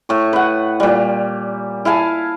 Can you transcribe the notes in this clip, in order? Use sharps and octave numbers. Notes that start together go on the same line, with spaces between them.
A2 C#6
B4 F#5
A#2 G3
E4 F5 G#5 A5